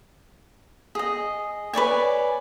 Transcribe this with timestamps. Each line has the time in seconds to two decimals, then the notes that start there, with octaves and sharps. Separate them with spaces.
0.95 G#4 D#5
1.73 B4 C#5 D5 G#5